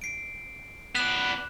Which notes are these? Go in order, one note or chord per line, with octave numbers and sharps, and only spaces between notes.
C7 D7
B3 D5 F#6 E7